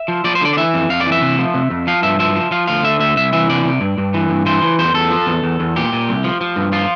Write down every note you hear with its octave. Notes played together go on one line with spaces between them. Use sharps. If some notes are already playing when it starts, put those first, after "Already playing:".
Already playing: E5
F3
F3 D5
C5
D3 D5
D5
E3 E5
F2
F2 F5
D5
E3
E5
C3
F3
C3
F2
F3 F5
G2 E5
F3 E5
F3
F3 F5
D2 F5
D3 E5
D2 E5
C2 E5
E3 E5
C3 D5
C3
G2
G2
E3
G2
E3 C5
E3
E2 C5
E2 A4
F3
E2
E2
E2
A#2 G4
A#2
C2
F3
F3
G2
F3 F4